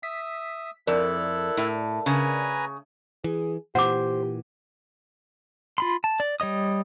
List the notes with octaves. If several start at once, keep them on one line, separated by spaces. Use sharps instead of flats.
E5 D#6 B6
F2 E4 A4 A#4 D5 F#6
A2
C#3 B4 G#5 A#5
E3 G#4
A#2 E3 G4 C5 F#5 D6
F4 B5 C6
A5
D5
G3 C#5 D#5 D#6